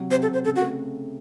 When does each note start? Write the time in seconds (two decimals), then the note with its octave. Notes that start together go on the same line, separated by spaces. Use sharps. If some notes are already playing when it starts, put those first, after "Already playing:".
Already playing: C3 F#3
0.10 C3 C5
0.22 A4
0.28 C3
0.34 C5
0.45 C#3 A4
0.56 F#4
0.62 A3